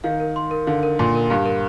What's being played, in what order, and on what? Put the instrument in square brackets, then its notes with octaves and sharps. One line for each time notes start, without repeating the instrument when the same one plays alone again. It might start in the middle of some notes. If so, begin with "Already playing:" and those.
[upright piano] D#3 [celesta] F5
[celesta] A#4
C6
A#4
[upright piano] D3 [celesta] F5
[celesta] A#4
[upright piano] A#2 [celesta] C6
[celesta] A#4
[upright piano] G2 [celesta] F5
[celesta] A#4